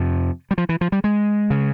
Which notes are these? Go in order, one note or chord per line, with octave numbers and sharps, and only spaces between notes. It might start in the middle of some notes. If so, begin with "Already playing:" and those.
Already playing: F2 C3 F3
G3
F3
E3
F3
G3
G#3
C#3